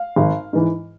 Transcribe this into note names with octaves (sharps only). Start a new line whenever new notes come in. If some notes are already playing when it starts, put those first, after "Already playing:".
Already playing: F5
G#1
G#2 E3